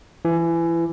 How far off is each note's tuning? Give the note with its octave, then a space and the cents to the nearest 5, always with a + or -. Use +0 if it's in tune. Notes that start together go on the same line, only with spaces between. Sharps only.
E3 +25